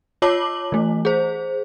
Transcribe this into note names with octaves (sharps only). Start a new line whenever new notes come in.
F4 C#5 A5 D6 F#7
E3 A3
G#4 C5